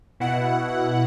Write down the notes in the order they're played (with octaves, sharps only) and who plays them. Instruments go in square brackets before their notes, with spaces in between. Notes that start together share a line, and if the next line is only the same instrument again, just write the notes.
[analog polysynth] B2 E4 F#5